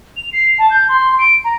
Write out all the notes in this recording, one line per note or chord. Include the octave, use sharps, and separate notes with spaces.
F7
C7
A5
G6
C6
D7
A#5